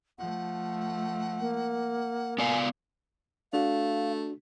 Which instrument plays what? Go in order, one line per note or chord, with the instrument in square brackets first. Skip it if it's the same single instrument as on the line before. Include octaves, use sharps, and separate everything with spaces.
[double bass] F3 A3 [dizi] F#5
[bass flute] A#3
[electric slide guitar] B3 D5 F5 [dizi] G#5
[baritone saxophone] A3 [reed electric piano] D4 F#4 [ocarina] F5